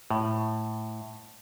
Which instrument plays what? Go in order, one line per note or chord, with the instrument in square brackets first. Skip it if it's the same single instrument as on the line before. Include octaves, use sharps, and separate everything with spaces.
[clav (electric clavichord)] A2